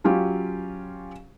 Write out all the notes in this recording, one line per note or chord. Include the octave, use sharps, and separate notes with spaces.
F#3 C#4 F4 G4